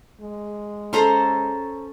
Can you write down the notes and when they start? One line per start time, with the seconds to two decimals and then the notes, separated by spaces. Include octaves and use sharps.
0.21 G#3
0.93 C#4 A4 C5 A#5 C6